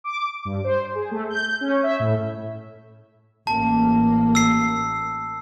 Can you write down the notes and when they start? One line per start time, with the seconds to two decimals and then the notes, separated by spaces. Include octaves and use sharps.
0.04 D6
0.45 G2
0.64 C5
0.95 G#4
1.11 A3
1.30 G6
1.61 C#4
1.83 E5
2.00 A2
3.47 A1 A#3 A5
4.35 E6 C7